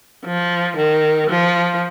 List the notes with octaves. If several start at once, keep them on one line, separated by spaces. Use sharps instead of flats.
F3
D#3
F3